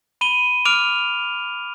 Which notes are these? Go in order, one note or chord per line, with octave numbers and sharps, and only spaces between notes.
B5 D#7 G7
D6 F6 D7 F7